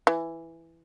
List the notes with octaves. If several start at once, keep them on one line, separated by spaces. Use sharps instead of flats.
E3